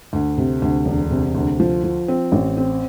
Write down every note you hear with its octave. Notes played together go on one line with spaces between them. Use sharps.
D2
C3
D2
E1
C3
D2
F3
F3
C4
A1
C4